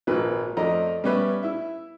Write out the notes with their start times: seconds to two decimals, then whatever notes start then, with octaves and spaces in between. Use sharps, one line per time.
0.07 G#1 A#2 F3 B4
0.57 F2 F3 A3 D5 D#5 A#5
1.04 G3 B3 C#4 B4 E5
1.43 E4 E5